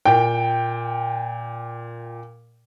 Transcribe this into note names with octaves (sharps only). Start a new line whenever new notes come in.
A#2 G5